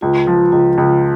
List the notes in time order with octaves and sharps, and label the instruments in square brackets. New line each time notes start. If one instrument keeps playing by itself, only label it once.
[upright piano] C#2 [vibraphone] F4
[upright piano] F3
[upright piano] C#2 [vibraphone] F4
[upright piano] C#2